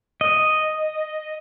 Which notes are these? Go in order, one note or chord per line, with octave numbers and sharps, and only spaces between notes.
D#5